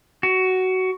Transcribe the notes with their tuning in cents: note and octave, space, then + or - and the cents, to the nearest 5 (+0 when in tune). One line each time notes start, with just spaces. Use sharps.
F#4 +15